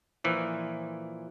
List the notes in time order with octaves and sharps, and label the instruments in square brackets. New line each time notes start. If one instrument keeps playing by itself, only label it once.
[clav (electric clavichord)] A#2 E3 F3